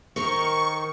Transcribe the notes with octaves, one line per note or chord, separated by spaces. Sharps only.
D#3 A#4 C5 C#6